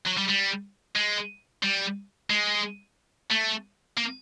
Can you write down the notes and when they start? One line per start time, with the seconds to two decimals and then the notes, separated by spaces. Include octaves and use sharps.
0.07 F#3
0.18 G3
0.29 G3
0.96 G#3
1.63 G3
2.30 G#3
3.31 A3
3.97 A#3